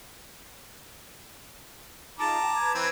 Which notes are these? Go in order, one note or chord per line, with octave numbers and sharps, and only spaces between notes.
D#4 F4 G#4 A5 A#5 D6
G5
B4 G#6
E3 C4